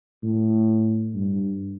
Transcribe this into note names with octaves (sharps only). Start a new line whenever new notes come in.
A2
G2